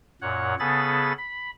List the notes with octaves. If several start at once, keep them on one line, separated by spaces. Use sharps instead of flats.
F#2 A#2 C#5 F#5
C#3 B3 G#4 A4 B5 A6
B5